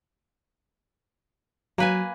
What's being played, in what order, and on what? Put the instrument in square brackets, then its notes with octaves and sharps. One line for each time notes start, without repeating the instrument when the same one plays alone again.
[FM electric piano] F#3 [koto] A#3 B4 G#5